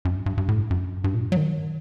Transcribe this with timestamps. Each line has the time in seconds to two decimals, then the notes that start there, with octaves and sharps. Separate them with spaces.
0.05 F#2
0.16 G2
0.26 G2
0.37 G2
0.48 A2
0.70 F#2
1.04 G2
1.14 A#2
1.32 F#3
1.37 D#3